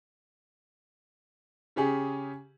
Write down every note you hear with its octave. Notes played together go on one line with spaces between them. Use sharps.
C#3 C#4 G4 G#4